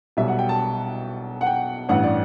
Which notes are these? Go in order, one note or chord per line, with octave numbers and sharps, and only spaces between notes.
B1 B2 G3 E5
F#5
G5
A5
F#5
G5
A1 G2 E3 F#5
D5